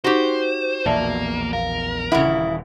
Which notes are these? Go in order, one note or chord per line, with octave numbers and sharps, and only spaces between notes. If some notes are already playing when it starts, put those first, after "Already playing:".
D#4 F#4 G4 C5 F#5
A#1 E2 B2 A#3 D5 E5 A5
A#4 F5
D#1 C#3 E3 E4 F#5